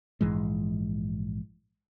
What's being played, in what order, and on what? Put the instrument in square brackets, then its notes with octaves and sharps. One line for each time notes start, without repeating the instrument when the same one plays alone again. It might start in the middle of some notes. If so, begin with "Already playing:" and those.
[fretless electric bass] A#1 G#2 E3 G#3